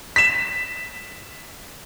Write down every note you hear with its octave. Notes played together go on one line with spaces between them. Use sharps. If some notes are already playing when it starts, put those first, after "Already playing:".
B6 E7